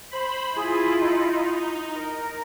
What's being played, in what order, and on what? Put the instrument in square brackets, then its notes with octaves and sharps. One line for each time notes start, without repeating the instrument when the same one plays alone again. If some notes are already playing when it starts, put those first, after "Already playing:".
[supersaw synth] C5 B5
[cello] E4 F4 [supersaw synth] G#4
[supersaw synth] D#4
[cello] A#4